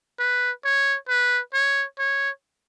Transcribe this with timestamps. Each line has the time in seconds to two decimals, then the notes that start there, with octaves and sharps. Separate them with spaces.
0.20 B4
0.65 C#5
1.09 B4
1.54 C#5
1.99 C#5